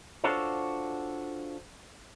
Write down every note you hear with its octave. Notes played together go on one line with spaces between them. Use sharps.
D4 F4 F#4 A4 C5 C#5